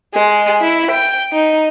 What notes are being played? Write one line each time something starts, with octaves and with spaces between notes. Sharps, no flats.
G#3
E4
G5
D#4